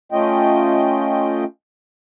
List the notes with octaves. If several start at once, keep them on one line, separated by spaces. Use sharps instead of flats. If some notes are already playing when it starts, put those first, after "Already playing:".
A3 C#4 F4 D#5 G5